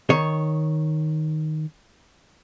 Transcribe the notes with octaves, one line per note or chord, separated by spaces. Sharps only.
D#3 C#5